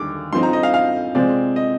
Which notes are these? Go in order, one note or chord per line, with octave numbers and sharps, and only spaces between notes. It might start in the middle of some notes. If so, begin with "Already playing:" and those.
Already playing: D#2 D3 G3 D6
G2 F3 C4 D#4 C6
A#5
D#5
F5
F5
C3 F3 G#3 C4 D5
D#5